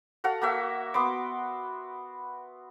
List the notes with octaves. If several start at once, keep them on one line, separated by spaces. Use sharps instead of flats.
F#4 A4 F5 F#5
A#3 F#4 E5
B3 C6 D6